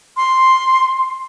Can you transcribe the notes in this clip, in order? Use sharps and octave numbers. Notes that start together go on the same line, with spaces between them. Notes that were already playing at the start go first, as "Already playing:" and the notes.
C6